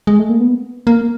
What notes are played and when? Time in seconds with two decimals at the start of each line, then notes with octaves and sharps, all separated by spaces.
0.07 G#3
0.19 A3
0.29 A#3
0.40 B3
0.87 A#3